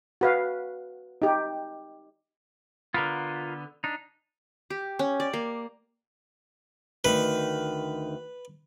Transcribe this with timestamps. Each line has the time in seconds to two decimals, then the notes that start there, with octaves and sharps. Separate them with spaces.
0.21 F#4 B4 F5
1.22 D#4 G4
2.94 D3 B3 F4 A#4
3.84 D4 D#4
4.70 G4
4.99 C#4
5.20 D5
5.33 A#3
7.05 D2 D#3 B4